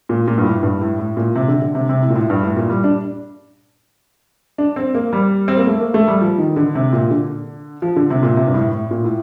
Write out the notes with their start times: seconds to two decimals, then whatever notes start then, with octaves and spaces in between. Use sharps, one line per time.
0.09 A#2
0.28 A#2
0.38 G2
0.45 A2
0.63 G2
0.81 A2
0.99 A2
1.17 A#2
1.36 C3
1.48 D3
1.62 D3
1.75 C3
1.89 C3
2.02 A2
2.10 A#2
2.15 A2
2.30 G2
2.43 A2
2.57 A#2
2.70 G3
2.84 D4
4.58 D4
4.76 C4
4.94 A#3
5.13 G3
5.48 C4
5.57 A#3
5.67 A3
5.80 A#3
5.94 A3
6.08 G3
6.21 F3
6.38 D#3
6.56 D3
6.75 C3
6.93 A#2
7.11 D3
7.82 F3
7.96 D3
8.10 C3
8.23 A#2
8.37 C3
8.47 G2
8.54 A2
8.72 A2
8.91 A#2
9.04 A2